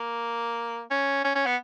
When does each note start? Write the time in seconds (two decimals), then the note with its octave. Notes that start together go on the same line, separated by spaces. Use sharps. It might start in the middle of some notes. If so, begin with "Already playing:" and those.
Already playing: A#3
0.91 C#4
1.24 C#4
1.35 C#4
1.46 B3